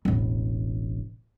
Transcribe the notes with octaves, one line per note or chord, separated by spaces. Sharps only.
E1 A1